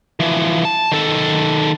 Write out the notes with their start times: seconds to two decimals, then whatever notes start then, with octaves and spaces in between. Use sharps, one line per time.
0.20 E3 F3
0.65 A5
0.92 D#3 A4